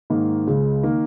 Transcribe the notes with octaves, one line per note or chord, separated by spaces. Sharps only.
G#2 D#3 A#3
C#2 C#3 G#3
D#3 A#3